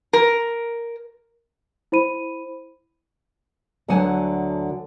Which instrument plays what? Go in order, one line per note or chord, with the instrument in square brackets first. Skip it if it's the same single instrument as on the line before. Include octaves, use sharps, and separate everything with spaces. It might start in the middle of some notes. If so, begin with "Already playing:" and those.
[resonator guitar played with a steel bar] A#4
[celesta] E4 C5 B5 D#7
[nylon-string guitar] D2 D3 F#3 F#5 G#5 A5